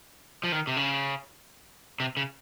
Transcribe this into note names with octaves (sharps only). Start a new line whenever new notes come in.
F3
D#3
C3
C#3
C3
C#3